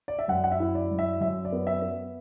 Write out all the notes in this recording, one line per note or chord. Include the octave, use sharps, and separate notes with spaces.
D5
E5
F#2 F#5
F#5
E5
E4
D5
F#2
E5
F#2 E5
D5
B3
E5
B3